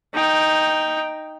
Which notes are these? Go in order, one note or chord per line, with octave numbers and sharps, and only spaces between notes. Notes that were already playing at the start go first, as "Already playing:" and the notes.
D#4 G5